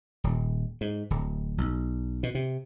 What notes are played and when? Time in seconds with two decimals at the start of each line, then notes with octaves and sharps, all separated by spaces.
0.24 D#1
0.81 G#2
1.10 D1
1.58 B1
2.23 B2
2.35 C3